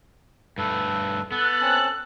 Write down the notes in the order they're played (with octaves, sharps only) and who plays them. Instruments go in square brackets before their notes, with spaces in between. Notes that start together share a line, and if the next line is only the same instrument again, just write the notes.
[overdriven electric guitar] G2 A3 [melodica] A4 B4
[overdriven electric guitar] B3 [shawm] A4 [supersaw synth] F#6
[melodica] C4 C#4 A5